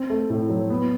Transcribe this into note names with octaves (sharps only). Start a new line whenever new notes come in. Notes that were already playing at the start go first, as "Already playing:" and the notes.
Already playing: C4
A3
A2
F#3
B3